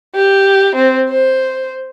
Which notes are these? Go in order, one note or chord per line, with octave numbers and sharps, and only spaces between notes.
G4
C4
C5